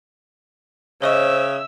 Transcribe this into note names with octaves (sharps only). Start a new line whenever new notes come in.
C#3 C5 C#5 D#5 E5 C#6 E6